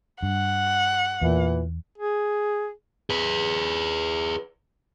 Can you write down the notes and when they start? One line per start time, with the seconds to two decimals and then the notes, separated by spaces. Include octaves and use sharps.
0.23 G2 F#5
1.21 E2 A#2 E3
1.98 G#4
3.10 G#4 B4